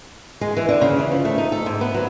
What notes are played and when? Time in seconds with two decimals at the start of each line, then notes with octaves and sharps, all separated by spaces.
0.41 G#3
0.57 E3
0.69 D3
0.81 C#3
0.99 E3
1.12 F3
1.25 A3
1.38 D#4
1.52 A4
1.66 G#2
1.81 B3
1.94 F#3